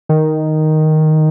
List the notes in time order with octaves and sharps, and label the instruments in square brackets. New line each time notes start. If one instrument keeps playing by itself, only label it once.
[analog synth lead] D#3